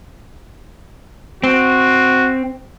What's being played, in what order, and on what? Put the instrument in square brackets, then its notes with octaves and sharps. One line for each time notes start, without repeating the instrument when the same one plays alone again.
[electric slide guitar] C4 [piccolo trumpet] F#4